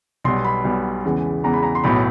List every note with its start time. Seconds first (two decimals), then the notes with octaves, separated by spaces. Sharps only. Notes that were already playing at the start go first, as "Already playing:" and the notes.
0.24 B1 B2 G3 C6
0.45 B5
0.65 B1 B2 G3
1.05 E2 C#3 E3 G#3
1.44 E2 C#3 E3 G#3 A#5
1.54 B5
1.63 A#5
1.75 C6
1.84 B1 A2 F#3 B5